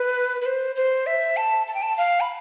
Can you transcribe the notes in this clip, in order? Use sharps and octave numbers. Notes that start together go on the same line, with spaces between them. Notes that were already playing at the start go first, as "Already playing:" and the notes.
Already playing: B4
B4
C5
C5
E5
A5
A5
G5
A5
F5
B5